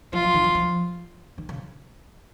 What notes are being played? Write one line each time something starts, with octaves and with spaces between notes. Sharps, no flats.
F3 F4
F3
D#3
F3
F3
D#3
C#3